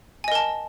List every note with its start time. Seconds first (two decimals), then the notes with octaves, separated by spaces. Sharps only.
0.24 G#5
0.28 D#5
0.32 A#4
0.35 A5